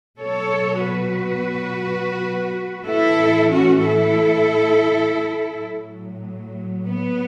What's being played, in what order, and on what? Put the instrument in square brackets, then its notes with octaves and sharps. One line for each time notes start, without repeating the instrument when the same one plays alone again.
[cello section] B2 F#3 A4 C#5
F#4 B4
A2 E3 E4 A4
C#4 F#4
E4 A4
A2 F#3
B3